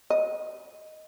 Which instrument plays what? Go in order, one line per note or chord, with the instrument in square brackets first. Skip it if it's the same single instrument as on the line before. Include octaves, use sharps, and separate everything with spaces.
[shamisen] D#5